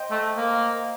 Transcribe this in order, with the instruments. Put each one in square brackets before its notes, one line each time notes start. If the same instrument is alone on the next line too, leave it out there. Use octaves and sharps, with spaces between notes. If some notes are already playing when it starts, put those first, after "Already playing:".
Already playing: [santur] C5 D#5 G5
[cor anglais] A3
A#3